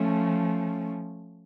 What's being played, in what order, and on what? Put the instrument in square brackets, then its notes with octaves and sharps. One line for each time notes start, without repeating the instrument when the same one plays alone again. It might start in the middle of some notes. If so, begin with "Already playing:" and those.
Already playing: [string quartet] F3 A3 C#4